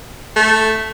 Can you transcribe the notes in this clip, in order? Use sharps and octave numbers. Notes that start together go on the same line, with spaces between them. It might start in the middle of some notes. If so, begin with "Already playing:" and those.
A3